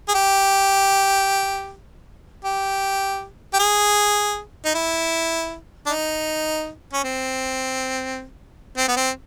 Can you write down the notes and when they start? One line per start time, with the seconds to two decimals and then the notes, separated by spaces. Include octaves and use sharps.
0.08 G#4
0.14 G4
2.45 G4
3.53 G4
3.60 G#4
4.65 D#4
4.75 E4
5.86 D4
5.89 D#4
6.93 C#4
7.04 C4
8.77 C4
8.88 B3
8.97 C4